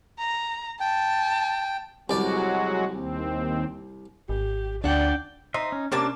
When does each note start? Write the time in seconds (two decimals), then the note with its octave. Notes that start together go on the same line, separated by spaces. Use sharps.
0.20 A#5
0.80 G5 A5
2.10 C2 F#3 G#3 F#4 D5
2.93 D#2 C4
4.29 G#1 G4
4.84 D2 D4 D5 F#5 G5
5.54 D#4 C5 D#5 E5
5.72 C#4
5.92 C3 A#3 C#4 D4 A5